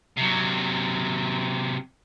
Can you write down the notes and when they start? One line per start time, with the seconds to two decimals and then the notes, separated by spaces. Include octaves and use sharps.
0.17 C3 F#3